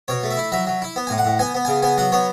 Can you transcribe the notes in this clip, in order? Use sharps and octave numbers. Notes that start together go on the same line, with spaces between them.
B2 C#5
A3
E5
E4
F#3 E5
F#3
E4
B3
A2 G#5
F#5
A2
B3 G#5
B3
C#3 G#5
B3 G#5
F#3 F#5
B3 C#5